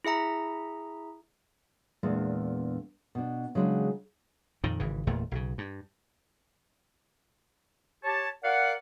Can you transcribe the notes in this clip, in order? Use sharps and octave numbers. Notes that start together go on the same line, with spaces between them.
E4 G#4 E5 A#5
E2 A#2 G#3 B3 D4
B2 D4
C#3 E3 F#3 G#3 B3 D4
F2 A#2 D#3
G#1 C#3 E3
G1 E2 A#2 A3
B1 C#3
G2
G4 C#5 A5
A#4 D5 F5 F#5